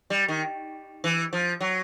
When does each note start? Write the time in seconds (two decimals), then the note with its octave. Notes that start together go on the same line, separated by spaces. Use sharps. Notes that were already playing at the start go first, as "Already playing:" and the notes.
0.10 G3
0.28 D#3
1.04 E3
1.33 F3
1.61 F#3